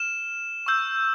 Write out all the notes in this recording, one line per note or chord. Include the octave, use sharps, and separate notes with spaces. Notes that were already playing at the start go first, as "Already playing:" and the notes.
Already playing: F6 E7
C#6 E6 G6